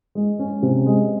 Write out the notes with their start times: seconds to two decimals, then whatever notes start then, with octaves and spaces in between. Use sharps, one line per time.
0.15 G#3
0.39 C#4
0.62 C3
0.86 G#3